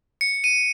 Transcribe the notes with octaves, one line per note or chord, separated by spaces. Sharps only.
C#7
D#7